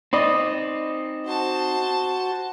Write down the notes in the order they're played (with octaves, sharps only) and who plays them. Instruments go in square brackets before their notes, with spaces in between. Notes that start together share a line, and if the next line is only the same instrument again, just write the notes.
[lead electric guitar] C4 D#4 [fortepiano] D5 D#5 B5
[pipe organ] F#4 [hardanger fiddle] C5 A5